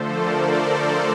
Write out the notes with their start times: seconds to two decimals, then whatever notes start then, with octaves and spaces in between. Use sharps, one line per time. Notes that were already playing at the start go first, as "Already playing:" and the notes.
Already playing: D3 F3 A3 A4 C5
0.13 A#4 D5
0.54 A4 C5